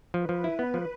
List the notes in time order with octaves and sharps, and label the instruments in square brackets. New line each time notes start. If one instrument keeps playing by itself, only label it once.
[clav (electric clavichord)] F3 [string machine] B4
[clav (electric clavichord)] F3
E4
B3
F3